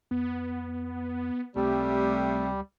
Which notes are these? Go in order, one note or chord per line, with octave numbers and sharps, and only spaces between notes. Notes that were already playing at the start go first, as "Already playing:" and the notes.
F2 B3
C#2 C3 G3 A3